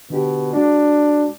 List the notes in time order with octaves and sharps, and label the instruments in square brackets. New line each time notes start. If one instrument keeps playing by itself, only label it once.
[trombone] B2 [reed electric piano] D3 G4
[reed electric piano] G#3 F#4 [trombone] D4